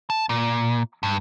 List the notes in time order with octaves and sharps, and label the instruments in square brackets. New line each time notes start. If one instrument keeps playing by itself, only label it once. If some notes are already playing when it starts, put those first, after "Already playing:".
[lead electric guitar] A5
A#2
G2